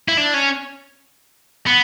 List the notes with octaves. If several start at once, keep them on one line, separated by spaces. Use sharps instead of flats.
E4
D4
C#4
B3